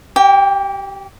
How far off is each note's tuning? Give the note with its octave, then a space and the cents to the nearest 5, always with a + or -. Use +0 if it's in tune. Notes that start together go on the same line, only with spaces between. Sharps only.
G4 -25 G5 +25